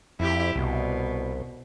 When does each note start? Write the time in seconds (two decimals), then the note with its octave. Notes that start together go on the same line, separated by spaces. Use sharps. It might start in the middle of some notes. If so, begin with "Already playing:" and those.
0.20 F2 E4 G4
0.56 C2 B2